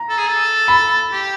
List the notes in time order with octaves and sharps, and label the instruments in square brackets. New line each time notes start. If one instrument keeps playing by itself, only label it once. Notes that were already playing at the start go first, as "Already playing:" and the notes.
Already playing: [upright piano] A#5
[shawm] A4
G#4
A4
[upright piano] B5
[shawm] G4